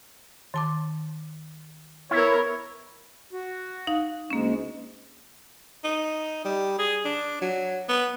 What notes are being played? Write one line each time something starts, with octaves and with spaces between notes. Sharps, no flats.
D#3 A5 D6
B3 E4 A#4 C#5
F#4
D#4 F5
D2 G#3 A#3 C#4
D#4
G3
G#4
D4
F#3
B3